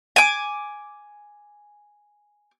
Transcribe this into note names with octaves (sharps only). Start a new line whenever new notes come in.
G#5 D6